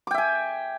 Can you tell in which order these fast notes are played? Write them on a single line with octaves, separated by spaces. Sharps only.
D6 G5 E5 G#5